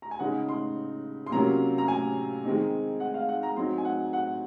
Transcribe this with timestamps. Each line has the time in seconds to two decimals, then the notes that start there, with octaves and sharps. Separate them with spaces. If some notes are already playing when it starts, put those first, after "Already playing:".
0.02 A#5
0.11 G#5
0.19 C#3 G#3 D#4 F#5
0.49 C6
1.26 C6
1.32 C3 F#3 A#3 C#4 F4 A#5
1.78 A#5
1.88 G#5
2.44 D#3 G#3 C4 D#4
3.00 F#5
3.14 F5
3.29 F#5
3.43 A#5
3.56 F#3 C4 D#4 C6
3.78 G#5
3.85 F#5
4.13 F#5